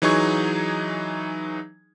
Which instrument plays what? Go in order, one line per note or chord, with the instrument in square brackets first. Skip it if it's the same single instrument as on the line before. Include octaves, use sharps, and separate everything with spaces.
[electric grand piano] E3 F#3 D#4 G#4 C#6 G#6